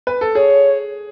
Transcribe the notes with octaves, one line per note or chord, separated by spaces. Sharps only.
B4
A4
G#4 C#5